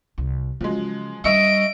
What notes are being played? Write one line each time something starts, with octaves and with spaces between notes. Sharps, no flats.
C2
C#3 F3 F#3 G#3
G3 D4 D#5 E5 C#6 E6 D7